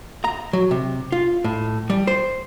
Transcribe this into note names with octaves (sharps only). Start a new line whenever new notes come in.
A#5
F#3
C3
F4
A2
G3
C5